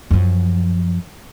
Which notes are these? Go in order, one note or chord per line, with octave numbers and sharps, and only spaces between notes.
F#2 F3